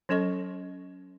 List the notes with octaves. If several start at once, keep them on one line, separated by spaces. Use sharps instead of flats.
F#3 C#4 A4 D#5 C#6